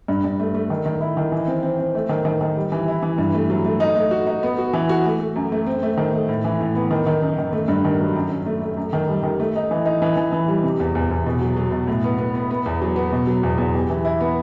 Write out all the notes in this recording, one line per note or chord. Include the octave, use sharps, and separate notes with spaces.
G2
G2
A3
A3
D#3
D#3
E4
D#3
E3
C4
C4
C4
A3
D#3
D#3
D#3
G3
E3
E4
E3
G2
A3
F#3
A3
D#4
A3
F#4
D#4
B3
F#4
E3
F#4
A3
A3
F#2
A3
C4
A3
D#3
A3
A2
E3
A2
B3
D#3
D#3
F#2
D#3
A3
G2
D#3
F#3
F#2
F#2
A3
A3
F#2
D#3
G3
D#3
A3
D#4
E3
D#4
E3
E3
E3
G3
C3
E2
E2
E2
B2
F#3
F#3
B2
A2
B3
B3
B3
B3
E2
F#3
B3
B2
F#3
E2
E2
G4
E3
E4
B3